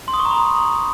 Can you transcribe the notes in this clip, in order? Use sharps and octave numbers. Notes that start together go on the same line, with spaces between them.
C6
D#6
C#6
A#5
B5